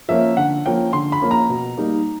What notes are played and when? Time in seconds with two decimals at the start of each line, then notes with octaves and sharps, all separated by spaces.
0.09 F3 A#3 C#4 E5
0.37 D3 F#5
0.65 F3 A#3 C#4 G5
0.93 D3 C6
1.12 B5
1.21 F3 A#3 C#4
1.31 A#5
1.49 B2
1.77 G3 A#3 D#4